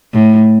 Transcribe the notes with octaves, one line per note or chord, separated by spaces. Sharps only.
A2